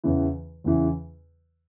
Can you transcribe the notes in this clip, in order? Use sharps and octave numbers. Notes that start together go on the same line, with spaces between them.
E2 C#3 E3
E2 C#3 E3